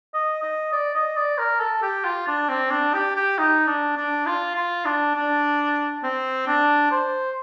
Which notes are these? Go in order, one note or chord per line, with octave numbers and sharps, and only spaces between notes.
D#5
D#5
D5
D#5
D5
A#4
A4
G4
F4
D4
C4
D4
G4
G4
D#4
D4
D4
F4
F4
D4
D4
C4
D4
C5